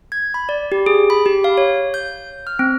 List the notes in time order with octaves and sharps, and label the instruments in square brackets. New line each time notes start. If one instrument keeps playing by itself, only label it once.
[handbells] G#6
B5
D5
G4
G#4
B5
G4
F5
C#5
G6
F6
C4